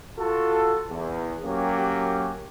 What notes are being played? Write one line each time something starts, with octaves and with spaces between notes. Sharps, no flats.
F4 F#4 A4
E2
F#3 A#3 C#4 G4